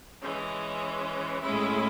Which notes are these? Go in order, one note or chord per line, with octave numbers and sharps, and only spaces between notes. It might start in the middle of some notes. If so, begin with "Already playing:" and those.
E3 G#3 C#4
A2 G#3 C#4 E4